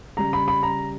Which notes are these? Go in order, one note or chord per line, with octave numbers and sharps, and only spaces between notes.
C#3 G3 A#5
B5
B5
A#5